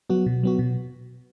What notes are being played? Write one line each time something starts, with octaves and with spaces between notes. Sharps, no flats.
F#3 B3 F#4
B2
F#3 B3 F#4
B2